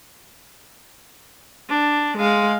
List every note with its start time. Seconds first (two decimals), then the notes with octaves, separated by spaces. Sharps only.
1.69 D4
2.17 G#3 F5